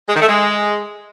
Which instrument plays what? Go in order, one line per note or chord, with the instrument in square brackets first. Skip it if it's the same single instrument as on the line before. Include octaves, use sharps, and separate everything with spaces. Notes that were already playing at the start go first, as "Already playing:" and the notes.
[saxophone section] G#3
D#3
A3
G#3